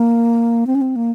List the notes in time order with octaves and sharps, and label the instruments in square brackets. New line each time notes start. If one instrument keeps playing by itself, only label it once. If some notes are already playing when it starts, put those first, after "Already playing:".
Already playing: [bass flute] A#3
C4
C#4
C4
A#3